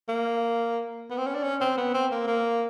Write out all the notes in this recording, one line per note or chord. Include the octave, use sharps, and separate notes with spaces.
A#3
B3
C4
C#4
D4
C#4
C4
B3
C4
A#3
A#3